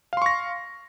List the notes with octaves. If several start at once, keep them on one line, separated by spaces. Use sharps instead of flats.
F5 C6 C#6 A#6